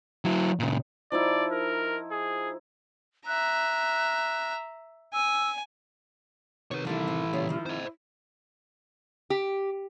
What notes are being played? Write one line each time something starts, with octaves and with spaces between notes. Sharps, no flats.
F#3 E4
A#2 C#3
F3 D#4 E4 D5
A#4
G#4
E5 A#5 F#6
G#5 E6
C3 D#3 B3 B4 C#5
D3 E3 G3 A#3 E4 A4
C4
A#2 C#3 G3 B3 C#4 F4
D#3 F3
C4 C5 D#5
G4